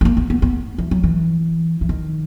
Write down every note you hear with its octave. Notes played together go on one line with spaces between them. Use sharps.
G#3
A#3
B3
B3
B3
E3
F#3
E3
E3
D#3